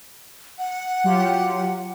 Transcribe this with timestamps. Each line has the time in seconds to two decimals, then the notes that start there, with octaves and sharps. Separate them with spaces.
0.59 F#5
1.04 F#3 F4 G4